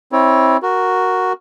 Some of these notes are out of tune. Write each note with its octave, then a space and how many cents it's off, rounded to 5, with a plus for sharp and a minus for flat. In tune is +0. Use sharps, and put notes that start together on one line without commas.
C4 +15 E4 -20 C#5 +15
F#4 +0 A#4 +0